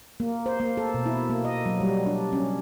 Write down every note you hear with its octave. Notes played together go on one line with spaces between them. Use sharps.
A#3
C5
A#3
A4
B2
E4
A#3
D#5
F#3
G3
D4
C#4